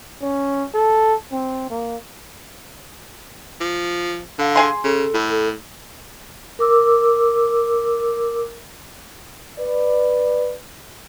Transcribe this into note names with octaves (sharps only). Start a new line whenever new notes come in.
C#4
A4
C4
A#3
F3
D3 F5
G#4 G#5 C6
C#3 A4
A2
A#4 D6 E6
B4 D5